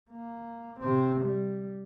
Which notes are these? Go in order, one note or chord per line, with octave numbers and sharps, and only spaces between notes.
A#3
C3 C4
G3